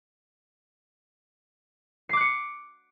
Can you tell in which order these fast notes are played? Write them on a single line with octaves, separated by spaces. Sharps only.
C7 D6 F#6 C#7